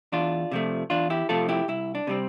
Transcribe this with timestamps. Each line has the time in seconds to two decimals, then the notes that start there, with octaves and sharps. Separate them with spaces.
0.12 E2 D4 F4
0.52 C3 F3 A3
0.90 E2 D4 F4
1.10 E4 G4
1.29 C3 F3 A3 F4 A4
1.49 E4 G4
1.68 C2 E4
1.95 D4
2.07 C3 G3 C4